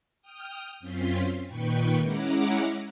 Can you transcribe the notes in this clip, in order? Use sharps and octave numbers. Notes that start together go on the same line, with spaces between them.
G5 D#6 F6
F#2 C4 C#4 F4 C6 B6
A#2 D#3 B4 G5 C#6
G#3 C#4 E4 F#5 A#5 D6